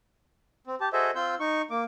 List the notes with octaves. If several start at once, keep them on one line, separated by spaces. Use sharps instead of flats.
C4
G4 A5
F#4 G#4 A4 C5 D#5 E5
C4 F4 C6 E6 G6
D#4 C#6
A#3 D6